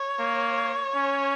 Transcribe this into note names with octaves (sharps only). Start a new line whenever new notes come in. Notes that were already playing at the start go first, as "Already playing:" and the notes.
Already playing: C#5
A#3
C#4